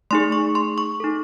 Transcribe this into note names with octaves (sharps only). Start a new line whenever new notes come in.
A3 D#4 G#4 C6
C#6
C6
C#6
D#4 A4